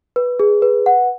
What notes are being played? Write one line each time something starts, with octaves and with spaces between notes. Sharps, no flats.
B4
G#4
B4
F#5